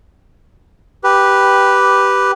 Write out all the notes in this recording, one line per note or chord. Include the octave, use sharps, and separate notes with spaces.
G4 B4